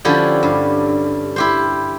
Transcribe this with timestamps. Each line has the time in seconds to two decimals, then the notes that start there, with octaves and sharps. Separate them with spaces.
0.05 D3 F3 C#4 D4 E4 G4
0.43 G2
1.36 E4 G4 C5